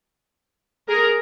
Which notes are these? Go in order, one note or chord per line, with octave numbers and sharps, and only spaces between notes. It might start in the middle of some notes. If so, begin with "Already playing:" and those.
G#4 A#4